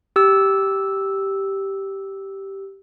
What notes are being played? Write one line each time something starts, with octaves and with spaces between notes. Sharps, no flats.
G4 E6